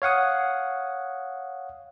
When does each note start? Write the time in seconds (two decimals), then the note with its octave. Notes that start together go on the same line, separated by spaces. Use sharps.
0.02 C#5 F5 F#5 D#6